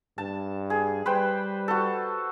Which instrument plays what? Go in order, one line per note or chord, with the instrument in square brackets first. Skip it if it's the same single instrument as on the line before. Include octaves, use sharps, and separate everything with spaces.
[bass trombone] G2 [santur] A5
[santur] G#4
[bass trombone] G3 [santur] B4 C5 G5
[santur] F#4 A4